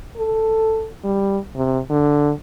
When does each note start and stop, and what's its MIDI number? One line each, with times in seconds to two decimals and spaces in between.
0.17 0.88 69
1.04 1.39 55
1.56 1.79 48
1.90 2.32 50